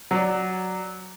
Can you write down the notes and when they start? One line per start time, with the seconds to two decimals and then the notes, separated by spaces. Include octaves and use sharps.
0.11 F#3 D5